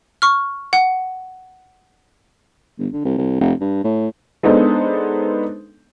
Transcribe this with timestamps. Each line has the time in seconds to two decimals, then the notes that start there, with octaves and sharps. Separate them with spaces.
0.22 C#6 F6
0.73 F#5
2.79 G1
2.93 D3
3.05 C2
3.18 C2
3.41 F1
3.61 G2
3.84 A2
4.43 G#3 B3 D4 D#4 A4 C5